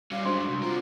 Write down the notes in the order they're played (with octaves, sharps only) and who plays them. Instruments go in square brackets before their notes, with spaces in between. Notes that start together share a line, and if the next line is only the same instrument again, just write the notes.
[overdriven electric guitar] G3 C#4 [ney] F5
[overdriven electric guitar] F#2 G#3 [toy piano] D4 C5 [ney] F#4 [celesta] C6
[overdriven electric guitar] C2
[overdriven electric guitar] C4 A#4 [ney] F4